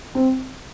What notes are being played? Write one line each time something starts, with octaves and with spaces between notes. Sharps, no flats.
C4